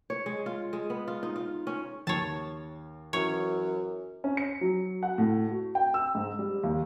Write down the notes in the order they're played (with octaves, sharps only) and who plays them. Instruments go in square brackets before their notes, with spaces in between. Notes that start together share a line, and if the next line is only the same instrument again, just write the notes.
[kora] C#5
G#3
F4
G#3
B3
F4
D#4
F4
C#4
[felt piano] D#2 C7 [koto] C#5 A5
[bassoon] F#2 [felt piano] E3 [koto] C#5
[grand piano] C#4
C#7
F#3
F#5
A2
F#4
G5
E6
G#2
G3
D#2